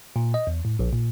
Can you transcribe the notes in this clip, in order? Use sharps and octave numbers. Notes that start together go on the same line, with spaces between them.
A#2
D#5
E2
A2
A#1
A#2